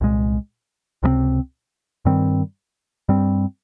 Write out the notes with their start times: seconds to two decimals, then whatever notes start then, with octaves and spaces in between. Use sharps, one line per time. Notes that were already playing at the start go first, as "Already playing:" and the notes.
0.01 C2 A#2 G#3
1.03 C#2 C3 G3 C4
2.05 G2 D#3 G3 C4
3.09 G2 G3 C4